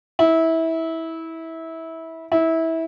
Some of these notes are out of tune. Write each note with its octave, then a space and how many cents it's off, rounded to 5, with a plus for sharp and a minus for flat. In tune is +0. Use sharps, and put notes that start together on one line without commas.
E4 -20
E4 -20